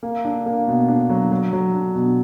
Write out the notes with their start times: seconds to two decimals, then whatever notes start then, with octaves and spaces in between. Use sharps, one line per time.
0.03 A#3
0.25 D4
0.46 A#3
0.68 B2
0.88 D4
1.09 F#3
1.31 F#3
1.53 F#3
1.74 D4
1.95 B2